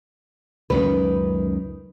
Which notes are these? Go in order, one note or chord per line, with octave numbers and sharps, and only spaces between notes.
C#2 F#2 D#3 B4